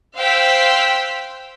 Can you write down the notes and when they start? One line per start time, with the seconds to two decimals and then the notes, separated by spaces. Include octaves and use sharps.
0.16 C5 F5 G5 E6 F#6 B6